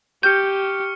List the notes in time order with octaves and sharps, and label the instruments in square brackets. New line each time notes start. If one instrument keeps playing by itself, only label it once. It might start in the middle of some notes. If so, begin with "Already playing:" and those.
[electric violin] G4 [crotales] C#6 F6 C#7 [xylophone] G6